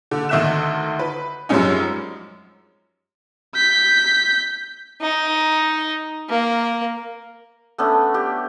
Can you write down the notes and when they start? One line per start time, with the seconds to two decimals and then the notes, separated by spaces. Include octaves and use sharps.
0.11 D3
0.29 D2 D#3 D#4 E5 F#6 E7
0.99 B4
1.49 F#2 F3 G3 G#3 C#4 D#4
3.55 G6 B6
5.01 D#4
6.29 A#3
7.78 A3 B3 C#4 D4
8.14 G4